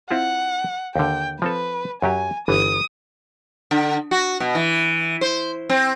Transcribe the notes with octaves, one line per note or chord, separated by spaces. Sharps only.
C4 E4 F4 F#5
D#2 D3 G5
F3 C4 A4 B4
F#2 F#3 G4 G#5
G1 E3 D#6
D3
F#4
B2
E3
C5
C4